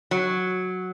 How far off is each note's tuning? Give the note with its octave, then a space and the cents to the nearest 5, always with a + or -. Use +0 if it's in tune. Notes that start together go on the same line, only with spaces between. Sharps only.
F#3 -5